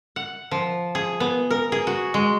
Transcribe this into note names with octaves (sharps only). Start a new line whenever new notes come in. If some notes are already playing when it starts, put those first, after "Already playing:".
F#5
F3
G#4
B3
A#4
G#4
F#4
G#3